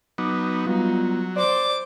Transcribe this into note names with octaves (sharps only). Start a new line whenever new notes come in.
F#3 B3 D#4 D6
F#3 G3 B3 D#4 F4
C5 D5 D6